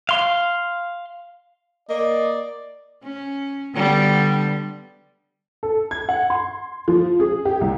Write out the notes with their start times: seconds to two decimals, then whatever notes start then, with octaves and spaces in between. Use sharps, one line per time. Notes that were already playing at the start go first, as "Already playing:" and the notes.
0.09 F5 C6
1.89 A#3 D5 D#5
3.04 C#4
3.74 D3 G3 B3
5.63 A4
5.91 G#6
6.09 F#5
6.30 C6
6.88 F3
7.20 G#4
7.45 G4
7.61 C2